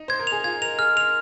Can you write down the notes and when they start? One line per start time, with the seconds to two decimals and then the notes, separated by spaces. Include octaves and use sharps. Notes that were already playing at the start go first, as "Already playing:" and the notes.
Already playing: D#4
0.08 C5 G#6
0.19 A#4
0.27 F7
0.32 G#4
0.44 F4 G#6
0.62 A#4 F7
0.78 G#4 F6
0.97 A#4 F7